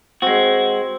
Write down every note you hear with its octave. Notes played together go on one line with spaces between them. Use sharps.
G#3 C4 F#4